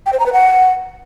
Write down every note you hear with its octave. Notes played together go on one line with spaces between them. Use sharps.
G5
C5
A#5
B4
F#5